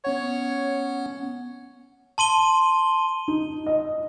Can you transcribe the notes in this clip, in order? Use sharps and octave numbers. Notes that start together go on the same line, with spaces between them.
B3 C#4 C#5 F#5
A5 C6 D#7 G7
D#4
D#5